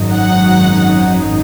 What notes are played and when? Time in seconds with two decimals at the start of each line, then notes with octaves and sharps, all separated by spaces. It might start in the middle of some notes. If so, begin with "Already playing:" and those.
Already playing: G#1 F#2 F#3 D#4
0.13 F#5